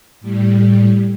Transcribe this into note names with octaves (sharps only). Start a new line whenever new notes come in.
A2 G3